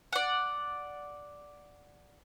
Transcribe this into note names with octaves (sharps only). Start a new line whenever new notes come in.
D5 F#5